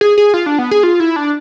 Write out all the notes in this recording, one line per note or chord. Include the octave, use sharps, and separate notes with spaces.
G#4
G#4
F4
D4
B3
G#4
F4
E4
D4